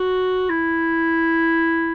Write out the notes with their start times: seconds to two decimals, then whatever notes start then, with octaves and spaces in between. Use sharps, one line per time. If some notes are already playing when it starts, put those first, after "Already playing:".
Already playing: F#4
0.50 E4